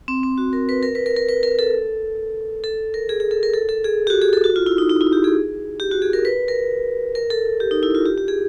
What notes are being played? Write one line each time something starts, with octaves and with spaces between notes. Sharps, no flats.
C4
C4
F#4
A#4
B4
A#4
B4
A#4
A#4
B4
A#4
A4
A4
A#4
G#4
G#4
A4
A#4
A4
A4
G#4
G4
F#4
G#4
A4
F#4
F4
E4
D#4
D#4
E4
G4
G#4
G4
F#4
G#4
A#4
B4
A#4
A#4
A4
G4
D#4
E4
F4
G4
G4
G#4